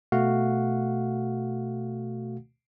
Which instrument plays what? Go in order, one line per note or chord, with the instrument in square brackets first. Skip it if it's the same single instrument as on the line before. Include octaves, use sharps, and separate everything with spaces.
[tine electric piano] B2 A3 F#4 F5 F#5